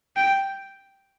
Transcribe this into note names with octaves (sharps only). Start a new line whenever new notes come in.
G5